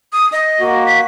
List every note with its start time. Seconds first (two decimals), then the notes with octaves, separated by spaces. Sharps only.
0.13 D#6
0.32 D#5
0.61 A#3 F#4
0.86 B6